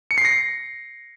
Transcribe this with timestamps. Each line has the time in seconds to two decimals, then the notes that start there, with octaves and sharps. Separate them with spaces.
0.11 C#7
0.18 C7
0.25 A#6